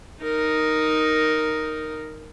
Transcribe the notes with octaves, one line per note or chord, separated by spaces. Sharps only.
D#4 A#4